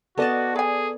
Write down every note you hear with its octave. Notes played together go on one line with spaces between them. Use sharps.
B3 F#4 A4 D5 D#5 A5
G#4 B4 G#5